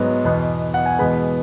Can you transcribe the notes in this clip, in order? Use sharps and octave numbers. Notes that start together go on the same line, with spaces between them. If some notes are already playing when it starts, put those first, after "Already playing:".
Already playing: G#2 F#3 B3
E2 B2 B3
F#5
G#5
E2 B2 G#3 B3 B5